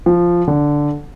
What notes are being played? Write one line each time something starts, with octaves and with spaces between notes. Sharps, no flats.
F3
D3